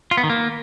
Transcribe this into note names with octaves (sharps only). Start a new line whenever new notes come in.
F4
B3
D#3
A#3